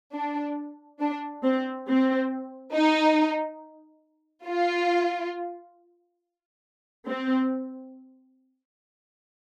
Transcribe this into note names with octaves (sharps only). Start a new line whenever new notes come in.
D4
D4
C4
C4
D#4
F4
C4